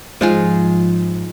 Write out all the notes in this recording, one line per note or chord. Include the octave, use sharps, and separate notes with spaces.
G#2 F3 D#4 F4 G#4